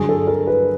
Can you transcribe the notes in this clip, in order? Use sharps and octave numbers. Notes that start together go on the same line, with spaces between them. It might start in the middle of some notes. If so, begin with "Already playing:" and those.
Already playing: G2 D3 F#3 G#4
A4
A#4
B4